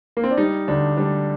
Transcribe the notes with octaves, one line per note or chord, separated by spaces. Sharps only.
A#3
C4
D4
G3 D#4
D2 D4
G3 D4